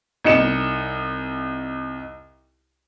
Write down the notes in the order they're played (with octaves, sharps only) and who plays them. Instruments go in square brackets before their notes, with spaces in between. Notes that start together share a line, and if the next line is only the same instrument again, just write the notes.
[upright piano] C2 D#4 C#7 E7